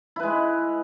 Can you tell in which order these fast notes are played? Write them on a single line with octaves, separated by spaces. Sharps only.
E4 B4 G#3